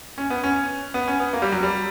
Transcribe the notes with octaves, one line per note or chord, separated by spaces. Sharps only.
C#4
B3
C#4
B3
C#4
B3
A#3
G3
F#3
G3